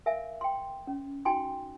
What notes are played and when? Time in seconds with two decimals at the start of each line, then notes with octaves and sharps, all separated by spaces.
0.06 A#4 E5 F5 G#5
0.41 G5 C6
0.87 C#4
1.25 D#4 F#4 G5 G#5 C6